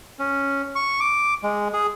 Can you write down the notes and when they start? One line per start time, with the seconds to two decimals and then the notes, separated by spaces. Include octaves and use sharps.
0.19 C#4
0.75 C#6
1.00 D6
1.43 G#3
1.73 G#4